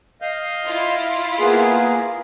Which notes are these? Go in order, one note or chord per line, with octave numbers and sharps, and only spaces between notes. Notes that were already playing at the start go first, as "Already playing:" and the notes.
D#5 F5 G6
E4 F4
A#3 B3 G#4